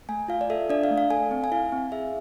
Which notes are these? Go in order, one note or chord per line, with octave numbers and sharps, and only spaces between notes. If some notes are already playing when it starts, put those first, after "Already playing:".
A3 G#5
F4 F5
D5
A4 E5
D4 D5
F5
A3
F5
A4 G#5
C4
G#5
E4 F5
C4
G#4 E5